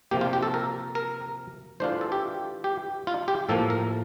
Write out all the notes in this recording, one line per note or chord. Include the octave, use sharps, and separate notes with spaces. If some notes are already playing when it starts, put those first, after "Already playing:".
C3 F3 A#3 G4
F4
G4
A4
A#4
A#4
E3 A3 D4 F4 C5
A4
G4
G4
F4
G4
A2 F3 A#3 A4
A#4